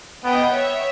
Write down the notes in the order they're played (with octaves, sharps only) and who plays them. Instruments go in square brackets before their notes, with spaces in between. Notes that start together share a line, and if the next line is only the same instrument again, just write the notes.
[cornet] B3 [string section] D#5 G5
[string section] C#5 E5